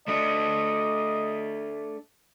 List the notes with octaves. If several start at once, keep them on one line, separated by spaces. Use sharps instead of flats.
A3 D4 D#5